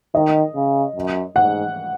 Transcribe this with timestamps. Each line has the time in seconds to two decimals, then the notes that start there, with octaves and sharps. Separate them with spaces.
0.15 D#3 D#5
0.55 C#3
0.95 F#2
1.36 G#2 F#5